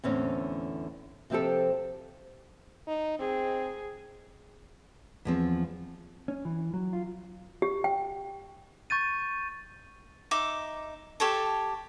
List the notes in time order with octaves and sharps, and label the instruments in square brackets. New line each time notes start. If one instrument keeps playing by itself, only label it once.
[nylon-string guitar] E2 A2 D3 C4 C#4
C3 F3 C4 G4 A4
[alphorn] D#4
[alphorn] C4 [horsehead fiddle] G#4
[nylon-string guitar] E2 F3 C4
[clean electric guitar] C#4
E3
F#3
F4
[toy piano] G4
G5
[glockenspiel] C#6 G6 A6 D#7
[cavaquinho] D#4 E5 D6
G4 A4 C#5 A5